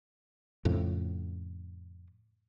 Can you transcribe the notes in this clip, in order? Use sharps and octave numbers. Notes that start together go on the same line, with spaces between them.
F2 A2 C#3